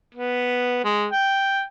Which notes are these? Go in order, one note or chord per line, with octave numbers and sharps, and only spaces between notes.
B3
G#3
G5